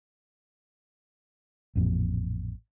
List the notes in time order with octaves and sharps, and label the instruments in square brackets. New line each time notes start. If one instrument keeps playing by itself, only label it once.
[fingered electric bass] A1 F2 A#2